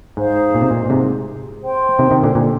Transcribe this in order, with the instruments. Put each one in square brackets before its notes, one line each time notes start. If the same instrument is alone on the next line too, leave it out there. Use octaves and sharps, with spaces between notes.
[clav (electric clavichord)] G#2 [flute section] D#4 G#4 C5 F5
[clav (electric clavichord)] A#2
C3
A#2
A#2
G#2 C3
[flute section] C5 G5 C6
[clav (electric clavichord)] C3 D#3
C3 D#3
A#2 D3
A#2 D3